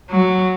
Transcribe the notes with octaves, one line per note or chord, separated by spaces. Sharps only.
F#3